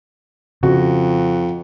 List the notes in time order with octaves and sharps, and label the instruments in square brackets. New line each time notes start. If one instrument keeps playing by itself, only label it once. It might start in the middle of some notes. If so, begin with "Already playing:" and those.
[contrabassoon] F2 [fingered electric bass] C#3 [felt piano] F#4